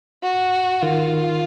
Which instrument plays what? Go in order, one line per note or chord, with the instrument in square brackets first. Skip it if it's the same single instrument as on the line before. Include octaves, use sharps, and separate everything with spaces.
[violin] F#4
[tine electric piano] D#3 [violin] F4